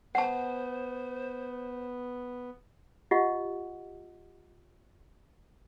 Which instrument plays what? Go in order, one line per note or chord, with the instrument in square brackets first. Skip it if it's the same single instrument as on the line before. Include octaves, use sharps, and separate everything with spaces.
[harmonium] B3 [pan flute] C5 [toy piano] F#5 A5
[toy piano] F4 G4 D#5 F#5